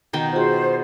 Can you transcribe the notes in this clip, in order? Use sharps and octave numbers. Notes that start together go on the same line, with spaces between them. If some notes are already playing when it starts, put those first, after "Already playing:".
B2 D#3 G5
F4 F#4 G#4 C5